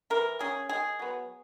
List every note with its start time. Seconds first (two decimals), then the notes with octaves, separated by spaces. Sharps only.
0.10 E3 A#4
0.39 A#3 C#4 G#4
0.69 D#3 G#4
0.99 F#3 B3